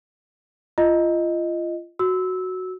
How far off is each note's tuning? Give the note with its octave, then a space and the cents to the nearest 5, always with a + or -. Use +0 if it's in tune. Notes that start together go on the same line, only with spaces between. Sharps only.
F4 -25 D#5 +0
F#4 +0 E6 -15